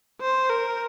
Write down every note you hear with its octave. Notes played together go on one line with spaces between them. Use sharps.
C5
A#4